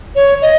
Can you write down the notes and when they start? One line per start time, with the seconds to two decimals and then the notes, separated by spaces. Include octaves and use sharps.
0.16 C#5
0.42 D#5